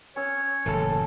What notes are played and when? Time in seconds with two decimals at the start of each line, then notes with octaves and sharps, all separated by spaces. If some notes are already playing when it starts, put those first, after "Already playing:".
0.16 C#4 C#5 E6
0.66 F#1 A2 E3 A4